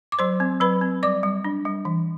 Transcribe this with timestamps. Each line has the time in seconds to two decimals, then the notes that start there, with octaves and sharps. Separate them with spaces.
0.12 D6
0.19 F#3 C5 C6
0.40 C4
0.60 F#3 B4 B5
0.81 C4
1.03 G3 D5 D6
1.23 G3
1.44 D4
1.65 G3
1.85 E3